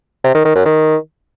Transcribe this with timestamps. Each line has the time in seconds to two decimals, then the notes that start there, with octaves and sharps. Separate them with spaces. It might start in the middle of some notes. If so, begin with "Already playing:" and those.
0.24 C3
0.35 D#3
0.45 D#3
0.55 F#2
0.66 D#3